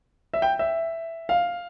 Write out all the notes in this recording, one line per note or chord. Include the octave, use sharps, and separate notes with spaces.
E5
G5
E5
F5